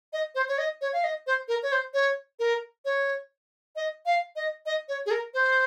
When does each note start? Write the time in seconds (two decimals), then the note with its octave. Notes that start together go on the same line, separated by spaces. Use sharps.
0.13 D#5
0.35 C5
0.49 C#5
0.58 D#5
0.81 C#5
0.93 F5
1.04 D#5
1.27 C5
1.48 A#4
1.63 C#5
1.72 C5
1.94 C#5
2.39 A#4
2.85 C#5
3.76 D#5
4.06 F5
4.36 D#5
4.66 D#5
4.89 C#5
5.06 G#4
5.11 A#4
5.34 C5